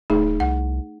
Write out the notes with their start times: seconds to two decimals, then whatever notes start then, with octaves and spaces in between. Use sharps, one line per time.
0.10 D1 A3 D#4 G#4
0.40 C2 F#5